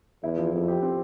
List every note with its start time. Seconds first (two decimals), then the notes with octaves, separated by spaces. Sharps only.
0.23 E2 E4
0.38 F3
0.52 F2 F3
0.68 G4
0.82 C4